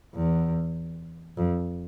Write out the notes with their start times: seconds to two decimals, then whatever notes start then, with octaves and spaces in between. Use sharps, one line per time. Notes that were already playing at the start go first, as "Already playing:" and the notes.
0.15 E2
1.37 F2